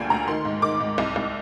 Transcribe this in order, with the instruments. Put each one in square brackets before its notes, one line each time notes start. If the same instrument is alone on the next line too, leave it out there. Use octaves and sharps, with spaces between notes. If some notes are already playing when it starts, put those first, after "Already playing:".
Already playing: [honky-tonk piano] D2 A#2 D3 G3 F5 G5 G#5
D2 A#5
D#3 C6
G#2
D#3 D6
G#2
C2
C2